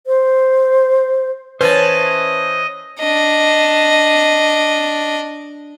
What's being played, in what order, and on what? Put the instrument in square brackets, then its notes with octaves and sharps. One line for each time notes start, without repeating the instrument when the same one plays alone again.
[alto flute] C5
[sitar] E3 C#4 [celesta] B4 [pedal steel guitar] C5 A5 [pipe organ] D#5
[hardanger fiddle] D4 D#5